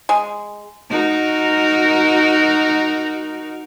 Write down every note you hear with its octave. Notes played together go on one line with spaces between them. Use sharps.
G#3
D#4 F#4 A#4